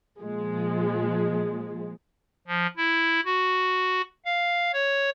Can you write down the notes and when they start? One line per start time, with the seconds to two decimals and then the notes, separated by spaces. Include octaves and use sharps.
0.19 A#2 F3 G#3
2.47 F3
2.77 E4
3.25 F#4
4.25 F5
4.73 C#5